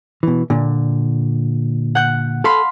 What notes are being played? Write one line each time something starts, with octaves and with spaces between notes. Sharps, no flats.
B2 E3
A#2 D3
F#5 G6
A4 F5 B5 C6